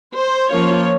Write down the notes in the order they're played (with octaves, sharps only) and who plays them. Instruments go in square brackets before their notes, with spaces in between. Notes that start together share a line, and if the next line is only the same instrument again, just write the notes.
[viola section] C5
F3 A#3 C#4 F4 C#5